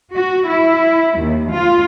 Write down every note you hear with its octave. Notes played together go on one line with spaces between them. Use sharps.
F#4
E4
D#2
F4